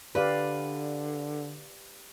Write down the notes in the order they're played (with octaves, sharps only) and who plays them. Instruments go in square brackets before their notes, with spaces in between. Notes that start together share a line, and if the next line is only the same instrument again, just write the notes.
[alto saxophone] D3 [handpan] G4 D5 F5 [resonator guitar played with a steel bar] B4